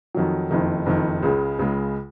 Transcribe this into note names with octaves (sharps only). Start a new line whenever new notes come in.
F2 D#3 F#3
F#1 F2 D#3
F#1 F2 D#3
C#2 C#3 G#3
C#2 C#3 G#3